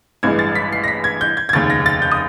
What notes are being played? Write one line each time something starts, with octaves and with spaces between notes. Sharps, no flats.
A1 G2 E3 G#3 G#6
A6
B6
C7
A#6
B6
G#6
G6
G#6
G#6
F1 D#2 C#3 A6
A#6
A6
G6
D#6